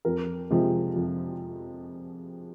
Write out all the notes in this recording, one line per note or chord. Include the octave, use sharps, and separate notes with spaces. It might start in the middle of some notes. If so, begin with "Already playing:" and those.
F2 A#4
C3 F3 G#3
F2